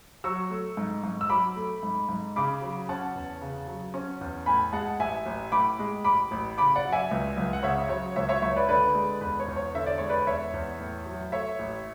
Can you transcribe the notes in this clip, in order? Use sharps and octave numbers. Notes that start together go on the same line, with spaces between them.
F#3 C#6 E6
A3
G#2
G#2
E6
F#3 B5 D6
A3
G#2
G#2
C#3 B5 D6
F#3
C#4 F#5 A5
E2
C#3
F#3
C#4
E2
A2 G#5 B5
G#3 F#5 A5
A1 E5 G#5
A1
A2 B5 D6
G#3
A1 B5 D6
A1
C#3 B5 D6
D5 F#5
F#3
E5 G#5
C#2
C#2
F#5
C#3 C#5 E5
F#3 C#5
C#2 C#5 E5
C#5 E5
C#2 C#5 E5
B4 D5
D3 B4 D5
G#3
E2 B4
C#5
E2
C#5
D3 E5
D5
G#3 C#5
B4 D5
E2 C#5 E5
E2
A2
F#3
A3 C#5 E5
A1